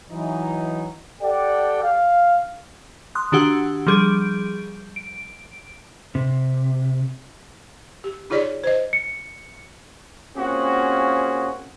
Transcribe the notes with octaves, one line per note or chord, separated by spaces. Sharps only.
E3 F#3 D#4
G4 A4 D5 F#5 G5
F5
C6 D#6 F#6
D#3 D4 F#4 G4 F#5 E6
F3 G3 G#4 G6 D7
D7
C3
G4
D#4 F4 G#4 C#5 D5
C5 D#5
C#7
A#3 C4 C#4 F4 F#4 G#4